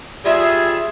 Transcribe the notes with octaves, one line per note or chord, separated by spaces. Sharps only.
G3 F4 G#4 E5